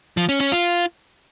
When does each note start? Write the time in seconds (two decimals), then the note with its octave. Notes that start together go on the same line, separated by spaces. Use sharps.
0.17 F3
0.29 C#4
0.40 C#4
0.52 F4